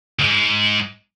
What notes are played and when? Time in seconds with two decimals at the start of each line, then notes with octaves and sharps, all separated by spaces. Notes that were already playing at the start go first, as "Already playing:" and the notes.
0.19 D2 G#2